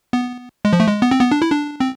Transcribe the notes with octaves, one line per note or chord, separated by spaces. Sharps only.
B3
G#3
F3
A3
G#3
B3
C4
B3
D4
E4
D4
C4